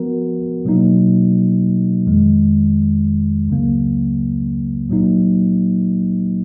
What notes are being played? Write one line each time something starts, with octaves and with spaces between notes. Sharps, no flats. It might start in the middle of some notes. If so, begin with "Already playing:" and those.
Already playing: F3 B3 F#4 A#4
B2 F#3 A#3 D#4
F2 D#3 G#3
C#2 C#3 F#3 A#3
A#2 F#3 A#3 D#4